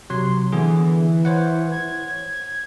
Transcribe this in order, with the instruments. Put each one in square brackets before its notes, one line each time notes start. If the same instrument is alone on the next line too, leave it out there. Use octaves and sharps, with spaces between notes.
[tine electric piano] C3 F#3 [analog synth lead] C6
[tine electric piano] D3 B3 G#4 [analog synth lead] E3
[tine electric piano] C5 C#5 F#5
[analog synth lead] G#6